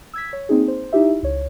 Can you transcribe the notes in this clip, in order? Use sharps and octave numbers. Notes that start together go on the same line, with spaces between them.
E6 G#6 B6
C#5
A#3 C4 D#4 G#4
C5
D#4 E4 G4 E5
C#2 C#5